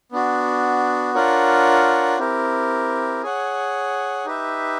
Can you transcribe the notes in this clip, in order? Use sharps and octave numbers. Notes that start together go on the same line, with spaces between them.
B3 D4 F#4
D4 F4 A#4 C#5 F#5
C4 E4 G4 A#4
G#4 C#5 F#5
D#4 G4 B4 E5